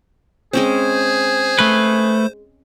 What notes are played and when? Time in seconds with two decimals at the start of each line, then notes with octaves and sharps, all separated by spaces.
0.53 G#3 C4 C#4 G#4 C5
1.59 A3 B4